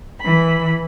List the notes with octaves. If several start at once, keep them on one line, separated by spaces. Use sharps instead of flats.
E3 B5